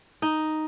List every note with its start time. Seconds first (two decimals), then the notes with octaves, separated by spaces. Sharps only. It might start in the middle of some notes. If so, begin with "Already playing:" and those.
0.22 D#4